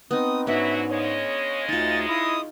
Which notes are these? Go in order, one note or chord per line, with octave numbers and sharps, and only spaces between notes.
B3 C4 D#4 D#6
G#2 F#3 B3 C#4 D4 E4 F#4 E5
C#3 G#3 C#5 D#5
D2 D#4 F4 A6
E4 D#6